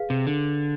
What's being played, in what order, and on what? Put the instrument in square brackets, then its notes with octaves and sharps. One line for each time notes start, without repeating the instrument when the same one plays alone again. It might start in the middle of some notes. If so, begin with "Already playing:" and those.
Already playing: [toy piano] G#4 B4 F5
[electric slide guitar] C3
D3